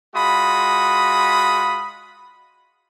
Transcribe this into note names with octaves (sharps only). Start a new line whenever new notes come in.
G#3 F4 F#4 B5 D#6